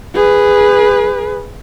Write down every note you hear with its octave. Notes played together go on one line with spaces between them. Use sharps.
G#4 B4